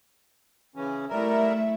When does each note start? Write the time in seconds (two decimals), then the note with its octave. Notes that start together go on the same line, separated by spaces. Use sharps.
0.76 C#3 E3 C#4
1.10 G3 A3 E4 A#4 E5